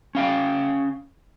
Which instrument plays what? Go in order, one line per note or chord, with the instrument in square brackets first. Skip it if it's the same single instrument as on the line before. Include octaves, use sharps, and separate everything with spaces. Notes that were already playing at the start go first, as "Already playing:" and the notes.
[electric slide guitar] C#4 F5 G5